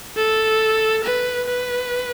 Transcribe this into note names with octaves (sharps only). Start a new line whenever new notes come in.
A4
B4
B4